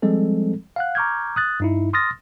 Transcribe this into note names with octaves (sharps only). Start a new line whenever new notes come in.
F3 G3 G#3 C4 A4
F5 F#5 F#6
A#5 C#6 D6 F6 G6 G#6
D#6 F#6 A6
G2 D#4 E4
C6 D#6 F6 A6 A#6